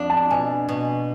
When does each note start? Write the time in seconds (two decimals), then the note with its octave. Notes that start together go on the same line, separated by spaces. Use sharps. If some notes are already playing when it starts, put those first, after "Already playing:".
Already playing: F2 D4
0.10 A5
0.30 B2 G#5
0.69 B2